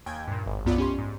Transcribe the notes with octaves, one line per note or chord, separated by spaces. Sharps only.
D#2 G5 G#5 G#6
G2 A#2
G#1
B1 F#2 B3 F4 D5 B5
C#4 G4 C6
G#2